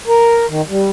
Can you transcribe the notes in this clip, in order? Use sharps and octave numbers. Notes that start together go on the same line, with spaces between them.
A#4
D#3
G3